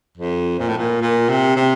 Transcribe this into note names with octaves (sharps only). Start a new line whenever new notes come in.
F2
A#2
A2
A#2
A#2
C3
C3